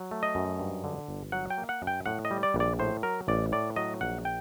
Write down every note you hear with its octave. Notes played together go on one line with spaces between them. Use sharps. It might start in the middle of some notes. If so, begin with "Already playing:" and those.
Already playing: F#3
A3
D#5
F#2
G2
D3
G1
F#3 F#5
G5
A#3
F#5
F#2
G5
A2 F#5
D#5
G3
D5
A#1
D5
A2 C5
F#3 A#4
A1 D5
A2 D5
F#3 D#5
A#1 F#5
G5